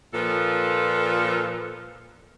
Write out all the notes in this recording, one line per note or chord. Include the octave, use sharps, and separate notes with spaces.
A#2 F3 F4 A4 B4